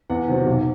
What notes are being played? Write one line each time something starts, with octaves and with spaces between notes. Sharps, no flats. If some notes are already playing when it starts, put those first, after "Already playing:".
E2 F#5
C3 D#3 F#3 C4
B1